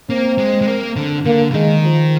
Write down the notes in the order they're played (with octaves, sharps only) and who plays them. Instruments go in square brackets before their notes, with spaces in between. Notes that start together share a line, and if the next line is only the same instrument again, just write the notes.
[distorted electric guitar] A#3 [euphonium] C4
[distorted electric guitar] G#3
G#3
A#3
D3
[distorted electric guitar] D3 [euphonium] A#3
[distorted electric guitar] D3
[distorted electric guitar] D#3 [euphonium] G#3
[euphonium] F3